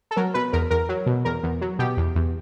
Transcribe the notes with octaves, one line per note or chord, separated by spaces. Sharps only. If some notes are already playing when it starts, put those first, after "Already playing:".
A4
F#3 A#4
B2 B4
E2 A#4
E2 A#4
F#3
B2
E2 A#4
E2
F#3
B2 G4
E2
E2